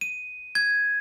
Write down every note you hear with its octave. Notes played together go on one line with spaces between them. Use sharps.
D#7
G#6